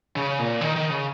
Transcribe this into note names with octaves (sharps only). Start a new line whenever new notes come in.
C#3
A#2
D#3
D#3
C#3